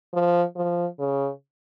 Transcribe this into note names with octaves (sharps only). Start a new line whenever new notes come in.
F3
F3
C#3